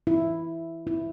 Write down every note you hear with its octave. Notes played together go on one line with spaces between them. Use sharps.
E4
E4